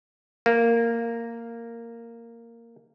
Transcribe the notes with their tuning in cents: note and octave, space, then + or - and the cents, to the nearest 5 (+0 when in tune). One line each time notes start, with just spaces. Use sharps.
A#3 -10